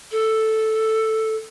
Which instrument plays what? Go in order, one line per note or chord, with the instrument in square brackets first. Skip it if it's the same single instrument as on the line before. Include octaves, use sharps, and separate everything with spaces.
[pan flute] A4